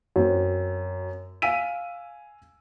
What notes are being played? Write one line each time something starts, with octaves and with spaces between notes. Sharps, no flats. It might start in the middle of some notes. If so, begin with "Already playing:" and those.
F#2 C4
F5 G#5 E6 B6 D#7